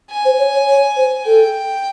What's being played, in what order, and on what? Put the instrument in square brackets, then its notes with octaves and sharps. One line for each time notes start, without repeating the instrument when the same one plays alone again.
[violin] G#5
[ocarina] C5
C#5
C#5
C#5
C5
[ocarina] A4 [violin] G5